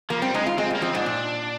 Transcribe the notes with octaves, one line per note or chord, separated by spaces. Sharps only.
F3 A#3
G3 C4
G#3 D#4
F4
G#3 C4
G3
A#3
F3 C4
G#2 D4
A#2